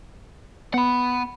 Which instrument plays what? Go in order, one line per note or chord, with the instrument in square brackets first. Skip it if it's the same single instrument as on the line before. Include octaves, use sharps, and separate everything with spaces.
[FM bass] B3 [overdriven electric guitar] F#5 B5